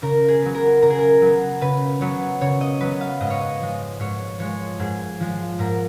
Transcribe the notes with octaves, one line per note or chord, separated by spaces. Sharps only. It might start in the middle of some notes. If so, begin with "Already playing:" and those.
C#3 A#4
G#4
F#3 B3
A#4
C#3 A#4
G#4
A#4
F#3 B3
C#3 B4
F#3 B3 C#5
C#3 C#5
D#5
F#3 B3 B4
F5
G#2 D#5
C#5
D#5
F3 G#3
G#2 C#5
F3 G#3 C#5
G#2 G#4
F3 G#3
G#2 A#4